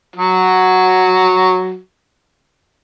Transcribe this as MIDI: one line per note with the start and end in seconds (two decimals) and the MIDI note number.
0.16 1.78 54
0.16 1.78 66